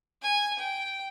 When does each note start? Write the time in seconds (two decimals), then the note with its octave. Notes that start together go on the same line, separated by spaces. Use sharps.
0.22 G#5
0.59 G5